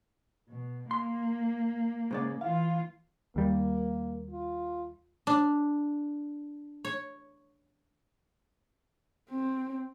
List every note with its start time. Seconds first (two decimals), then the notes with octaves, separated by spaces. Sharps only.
0.49 B2
0.91 A#3 C6
2.11 G#2 C#3 D5
2.41 E3 F4 F5
3.36 D#2 G3 A#3
4.31 F4
5.27 D4
6.85 C#5
9.30 C4